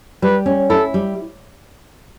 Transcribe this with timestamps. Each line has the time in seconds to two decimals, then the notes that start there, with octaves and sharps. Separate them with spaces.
0.22 G3 B4
0.46 C#4
0.70 E4 A4
0.94 G3